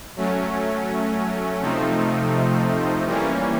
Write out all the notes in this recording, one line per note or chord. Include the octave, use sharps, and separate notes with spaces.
F#3 A3 C#4
C3 F3 A3 C4 D#4
E3 G3 A#3 C#4